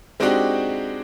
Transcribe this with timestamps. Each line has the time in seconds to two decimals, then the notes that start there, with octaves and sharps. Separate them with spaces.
0.20 G#3 C4 D4 D#4 F#4 G4